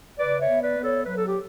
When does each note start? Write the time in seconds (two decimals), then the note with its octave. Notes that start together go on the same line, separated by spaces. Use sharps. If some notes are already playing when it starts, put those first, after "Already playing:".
0.19 C#3 B4 D5
0.40 C#5 E5
0.48 B3
0.62 B4 D5
0.77 B3
0.84 A4 C#5
1.05 F#3 B4
1.17 A4
1.27 G4